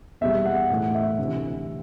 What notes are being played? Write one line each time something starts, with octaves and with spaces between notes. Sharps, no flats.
E2 B2 G3 E5
F#5
A2 E3 A3 F#5
E5
D2 C3 E3